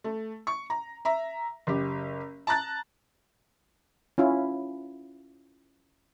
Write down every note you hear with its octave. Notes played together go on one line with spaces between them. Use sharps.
A3
C#6
A#5
E5 A#5
F#1 G4
A5 A#5 F#6 A6
C#4 E4 F4